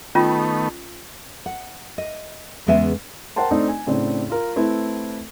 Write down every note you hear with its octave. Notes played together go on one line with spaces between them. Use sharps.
D#3 A3 B3 C#4 F4
F#5
D#5
E2 C#3 G#3 B3 E5 G#5
A#4 C5 F#5 G5 A5 C6
A3 C4 D4 D#4
G#5
A2 C#3 C4 D4
F4 A#4
A3 C4 E4 A4 B4